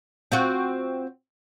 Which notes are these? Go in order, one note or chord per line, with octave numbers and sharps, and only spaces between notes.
C4 F4 F#4